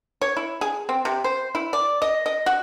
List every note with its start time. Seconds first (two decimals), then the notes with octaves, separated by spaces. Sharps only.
0.21 C#5
0.37 E4
0.61 G#4
0.89 C4
1.05 C3
1.24 C5
1.55 E4
1.73 D5
2.02 D#5
2.26 D#5
2.46 F#4